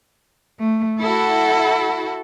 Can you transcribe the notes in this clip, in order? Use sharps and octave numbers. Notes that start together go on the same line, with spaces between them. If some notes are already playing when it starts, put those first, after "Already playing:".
A3
E4 F#4 A4